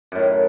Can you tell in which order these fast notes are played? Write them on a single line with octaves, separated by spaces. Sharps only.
F#2 A2 D#3